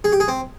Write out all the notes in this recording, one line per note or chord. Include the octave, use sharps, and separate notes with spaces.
G#4
G4
G#4
C4